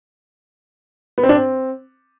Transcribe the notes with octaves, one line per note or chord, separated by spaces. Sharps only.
B3
C4
D4
C4